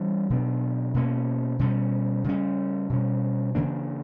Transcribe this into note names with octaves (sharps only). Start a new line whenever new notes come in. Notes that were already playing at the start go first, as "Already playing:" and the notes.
Already playing: E3 G3 C#4
B2 F#3 B3 D4
B2 A#3 C#4
B2 G3 C#4
C#3 G3 C#4
B2 G3 C#4
C#3 E3 A#3 D4